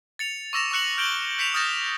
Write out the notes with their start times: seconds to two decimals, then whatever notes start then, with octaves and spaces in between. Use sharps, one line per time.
0.19 A6 C#7 F7
0.53 C#6 D6 E6 A#6 E7 F7
0.71 C#6 E6 F#6 C#7 F#7
0.97 F6 G6 D7 F#7 G7
1.38 G6 B6 C#7 E7 F7
1.54 D#6 F6 G6 A6 A#6 E7